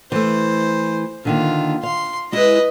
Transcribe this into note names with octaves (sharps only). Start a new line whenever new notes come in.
E3 A3 C5
D3 D#3 A#3 F4
F5 C6
G#3 E4 B4 D#5